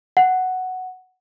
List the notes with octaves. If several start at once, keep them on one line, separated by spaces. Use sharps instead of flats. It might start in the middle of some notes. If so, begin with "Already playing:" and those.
F#5